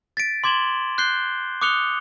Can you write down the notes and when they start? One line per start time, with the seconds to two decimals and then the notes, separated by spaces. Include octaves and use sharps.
0.17 A6 B6 D7
0.44 C6 D6 G#6 E7 F#7 G7
0.98 F#6 G6 C7 G7
1.61 D6 D#6 F#6 C#7 F7 G7